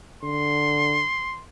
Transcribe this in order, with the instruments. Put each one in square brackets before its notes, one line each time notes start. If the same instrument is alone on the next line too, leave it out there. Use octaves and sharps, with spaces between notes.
[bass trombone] D3 [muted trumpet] C6